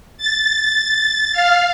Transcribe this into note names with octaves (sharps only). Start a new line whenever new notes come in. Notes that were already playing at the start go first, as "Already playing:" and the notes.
A6
F5